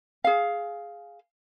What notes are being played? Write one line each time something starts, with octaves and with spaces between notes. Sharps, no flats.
G#4 F5